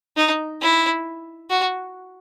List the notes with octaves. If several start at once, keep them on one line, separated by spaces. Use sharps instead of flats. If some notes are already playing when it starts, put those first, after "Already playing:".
D#4
E4
F#4